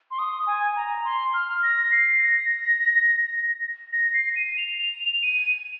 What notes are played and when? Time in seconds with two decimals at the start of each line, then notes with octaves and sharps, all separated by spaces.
0.11 C6
0.19 D#6
0.47 G#5
0.76 A#5
1.05 C6
1.34 F6
1.63 A#6
1.92 C7
2.19 A#6
3.93 A#6
4.14 C7
4.36 D#7
4.58 F7
4.78 F7
5.23 D#7